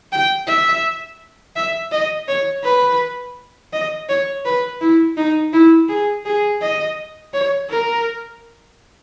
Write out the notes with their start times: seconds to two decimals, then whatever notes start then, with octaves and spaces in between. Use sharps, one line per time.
0.12 G5
0.47 E5
1.56 E5
1.92 D#5
2.28 C#5
2.64 B4
3.73 D#5
4.09 C#5
4.45 B4
4.81 E4
5.17 D#4
5.53 E4
5.89 G#4
6.25 G#4
6.61 D#5
7.33 C#5
7.70 A#4